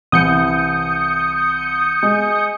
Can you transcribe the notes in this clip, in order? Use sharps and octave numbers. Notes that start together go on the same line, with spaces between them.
C2 E3 D#6 G6 C#7
G#3